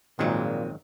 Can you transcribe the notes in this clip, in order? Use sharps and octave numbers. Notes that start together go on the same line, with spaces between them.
G#1 F2 A#2 D#3 F#3 G#3 C4